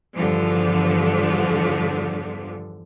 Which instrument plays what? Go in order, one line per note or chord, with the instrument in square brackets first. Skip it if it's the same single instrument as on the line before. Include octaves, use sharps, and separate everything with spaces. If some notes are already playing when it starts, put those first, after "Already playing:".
[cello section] E2 G2 D3 F3